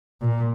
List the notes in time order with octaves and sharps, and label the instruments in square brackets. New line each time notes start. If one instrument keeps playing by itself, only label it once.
[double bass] A#2